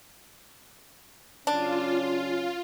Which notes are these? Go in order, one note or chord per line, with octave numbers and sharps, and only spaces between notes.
C#3 F#3 C#4 D4 F4